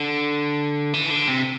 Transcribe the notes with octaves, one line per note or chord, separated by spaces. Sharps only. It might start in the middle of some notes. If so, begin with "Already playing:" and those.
Already playing: D3
E3
D3
C3